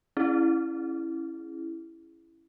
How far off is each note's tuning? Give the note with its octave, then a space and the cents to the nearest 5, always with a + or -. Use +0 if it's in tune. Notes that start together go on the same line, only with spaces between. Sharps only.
C#4 -15 E4 +5 G#4 +0